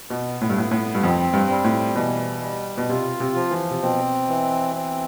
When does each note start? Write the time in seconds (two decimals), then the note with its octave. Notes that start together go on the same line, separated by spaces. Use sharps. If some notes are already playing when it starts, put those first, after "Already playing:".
0.10 B2 B3
0.41 A2
0.49 G2
0.56 A2 B3
0.71 A2
0.95 G2
1.02 F2 C4
1.33 G2
1.50 G3
1.64 A2
1.95 B2 E3
2.43 G3
2.78 B2
2.89 C3 F4
3.20 C3
3.35 F3
3.51 E3
3.71 C3
3.82 B2 C4
4.28 E3
4.75 C4